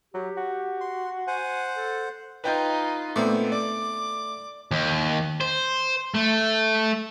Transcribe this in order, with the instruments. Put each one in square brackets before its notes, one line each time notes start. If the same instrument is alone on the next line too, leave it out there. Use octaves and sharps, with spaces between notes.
[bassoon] F#3 [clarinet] G4
[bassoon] F#4
[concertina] C6
[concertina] C5 F#5 [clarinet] G#5
[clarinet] A4
[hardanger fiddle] D#4 F4 [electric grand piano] B4 G5 G6
[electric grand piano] A#2 B3 C4 [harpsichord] A3 D4
[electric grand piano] D5 [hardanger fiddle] D6
[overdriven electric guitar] D#2
C5
A3